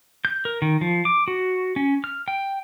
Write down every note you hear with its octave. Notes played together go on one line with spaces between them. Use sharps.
G6
A#4
D#3
F3
D6
F#4
C#4
F6
G5